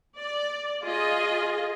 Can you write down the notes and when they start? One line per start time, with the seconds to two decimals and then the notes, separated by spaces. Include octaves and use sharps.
0.19 D5
0.84 F4 G#4 D#5